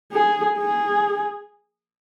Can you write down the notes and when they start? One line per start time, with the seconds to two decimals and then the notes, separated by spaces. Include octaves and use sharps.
0.12 G#4
0.58 G#4